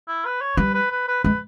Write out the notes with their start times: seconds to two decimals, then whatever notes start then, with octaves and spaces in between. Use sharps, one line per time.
0.08 E4
0.26 B4
0.41 C#5
0.57 G3 B4
0.74 B4
0.91 B4
1.08 B4
1.23 G#3 B4